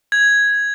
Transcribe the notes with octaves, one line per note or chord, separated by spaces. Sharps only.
G#6